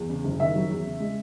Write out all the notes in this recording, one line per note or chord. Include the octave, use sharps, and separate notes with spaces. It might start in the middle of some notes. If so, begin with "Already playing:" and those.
Already playing: E2
C#3
F#1
D#3 E5
F#3
E2
C#3
G#3